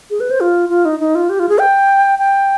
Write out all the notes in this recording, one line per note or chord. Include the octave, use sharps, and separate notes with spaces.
G#4
B4
C5
F4
F4
D#4
D#4
F4
G4
F4
G#4
G5
G5